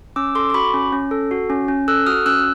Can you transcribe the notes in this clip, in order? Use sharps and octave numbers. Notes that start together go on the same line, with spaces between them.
C#4 D6 E6
A4 C6 D6
D6
F#4 B5 C#6
C#4
C#4
A4
F#4
C#4
C#4
A4 E6 F#6
F#4 D#6 F6
C#4 E6 F#6